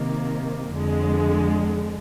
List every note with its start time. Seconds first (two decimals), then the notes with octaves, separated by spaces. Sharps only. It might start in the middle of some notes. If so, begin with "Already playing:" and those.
Already playing: C3 D#3 A#3
0.72 F2 D3 G#3